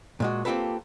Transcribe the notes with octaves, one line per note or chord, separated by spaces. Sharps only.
A#2 G#3 F#4
A#3 C4 F4 G4 A4 B4